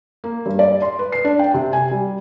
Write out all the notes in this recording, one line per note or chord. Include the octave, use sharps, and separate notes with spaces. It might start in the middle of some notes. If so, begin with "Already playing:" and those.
A#3
G2
D5
C6
B4
C7
D4
G5
C3
G#5
G3